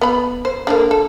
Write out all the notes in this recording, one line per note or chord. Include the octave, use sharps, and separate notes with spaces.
B3 B5
C5
D3 F3 A#3
A4